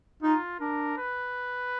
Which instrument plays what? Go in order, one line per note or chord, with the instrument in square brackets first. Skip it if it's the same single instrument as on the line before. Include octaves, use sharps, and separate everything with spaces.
[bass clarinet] D#4 [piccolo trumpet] F4
[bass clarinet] D4 [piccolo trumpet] A#4
[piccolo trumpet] B4